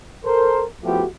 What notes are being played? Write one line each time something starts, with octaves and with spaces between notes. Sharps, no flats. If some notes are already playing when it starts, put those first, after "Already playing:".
A4 A#4 C5
F3 A3 B3 E4 F#4 G4